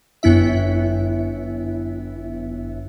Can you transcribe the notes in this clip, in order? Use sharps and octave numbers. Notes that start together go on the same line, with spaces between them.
G1 F#2 B3 E4 E5